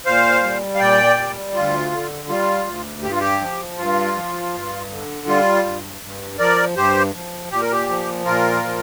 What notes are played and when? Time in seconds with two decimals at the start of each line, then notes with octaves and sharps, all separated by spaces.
0.06 A#2 C5 F5
0.43 G3
0.75 F5
0.79 A#2 D5 G5
1.18 G3
1.54 D2 F4
1.91 D3
2.29 G3 F4
2.67 D2
3.03 G2 G4
3.11 F4
3.20 G4
3.41 F3
3.78 G2 F4
4.15 F3
4.53 G2
4.90 D3
5.27 G3 F4
5.65 G2
6.02 G2
6.39 F3 A#4 D5
6.76 G2 G4 C5
7.14 F3
7.51 A#2 G4
7.62 A#4
7.72 G4
7.89 F3
8.25 A#2 F4 A#4
8.64 F3